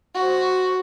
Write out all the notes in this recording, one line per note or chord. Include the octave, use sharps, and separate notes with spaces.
F#4 C5